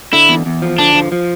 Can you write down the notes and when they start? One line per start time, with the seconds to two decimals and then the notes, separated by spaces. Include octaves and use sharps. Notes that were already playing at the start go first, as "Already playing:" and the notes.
0.13 D3 E4
0.29 E2
0.46 E2
0.62 F3
0.78 D3 D4
0.95 F3
1.12 F3